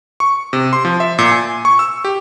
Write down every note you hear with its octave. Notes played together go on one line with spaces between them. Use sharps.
C#6
C3
C6
F3
E5
A#2
G#5
C#6
E6
G4